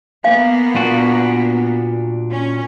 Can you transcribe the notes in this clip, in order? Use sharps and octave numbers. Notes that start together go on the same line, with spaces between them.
A#3 B3 F5 G#5
A#2 D4 F#4
C#4